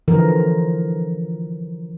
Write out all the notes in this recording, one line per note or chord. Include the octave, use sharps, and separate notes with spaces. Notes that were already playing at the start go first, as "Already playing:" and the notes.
D3 E3 F3 A#4